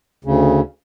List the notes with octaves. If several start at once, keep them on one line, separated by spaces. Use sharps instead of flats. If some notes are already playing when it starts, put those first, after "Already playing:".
D2 C#3